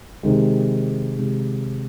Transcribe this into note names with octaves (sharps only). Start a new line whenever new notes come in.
C3 D#3 G#3
C3 D#3 G#3